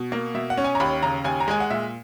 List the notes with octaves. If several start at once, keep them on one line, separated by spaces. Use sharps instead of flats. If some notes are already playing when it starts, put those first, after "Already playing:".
Already playing: B2
A#3
B2 E5
F#5
C#4
G#5
A#5
D#2 B5
C#3 A#5
D#2 G#5
A#5
G#3 G#5
F#5
A#2 E5